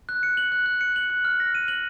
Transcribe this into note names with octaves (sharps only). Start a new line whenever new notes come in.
F#6
C#7
F#7
F#6
F#6
C#7
F#7
F#6
F6
A#6
D#7
F#7